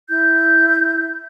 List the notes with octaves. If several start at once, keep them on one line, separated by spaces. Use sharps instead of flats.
E4 G6